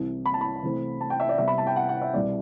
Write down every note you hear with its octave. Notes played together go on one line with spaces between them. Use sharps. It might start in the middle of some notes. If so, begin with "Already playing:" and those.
Already playing: C2 C3 E3
B5
A5
B5
C3 E3 A3 C4
A5
G5
E5
D5
C3 G3 B3 E5
B5
A5
G5
F#5
F#5
E5
C2 B2 G3 B3 D5